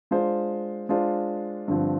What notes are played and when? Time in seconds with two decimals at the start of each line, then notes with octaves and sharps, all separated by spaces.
0.11 G#3 D4 F4 C5
0.89 G#3 D4 F4 C5
1.68 G2 D3 F3 C4